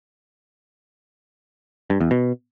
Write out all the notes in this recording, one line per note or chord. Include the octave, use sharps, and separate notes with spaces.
G2
E2
B2